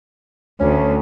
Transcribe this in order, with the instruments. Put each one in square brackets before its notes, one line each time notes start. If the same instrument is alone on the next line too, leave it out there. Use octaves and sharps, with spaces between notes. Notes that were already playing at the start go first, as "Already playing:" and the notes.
[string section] D2 [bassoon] C#4